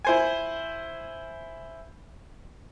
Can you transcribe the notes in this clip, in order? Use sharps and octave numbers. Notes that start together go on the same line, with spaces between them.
E4 C5 G#5